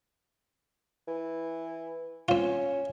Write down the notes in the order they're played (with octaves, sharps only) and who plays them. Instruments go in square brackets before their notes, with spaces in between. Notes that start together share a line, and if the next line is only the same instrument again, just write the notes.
[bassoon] E3
[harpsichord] C4 F4 [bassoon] C#4